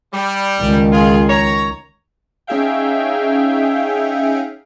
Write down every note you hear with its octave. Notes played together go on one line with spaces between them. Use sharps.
G3
C#2 D#3
F4 G#4
C#5 A#5
C#4 D#4 G#4 E5 F5 G5